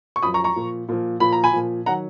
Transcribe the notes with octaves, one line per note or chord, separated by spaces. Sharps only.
C#6
F#2 F3 B5 D#6
A#5 C#6
A#5 C#6
A#2 F3
A#2 F3
A#2 F3 B5
A#5
G#5 B5
A#2 F3
D#3 F#3 F#5 A#5